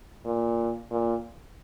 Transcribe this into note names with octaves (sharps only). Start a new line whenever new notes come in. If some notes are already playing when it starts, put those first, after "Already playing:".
A#2
A#2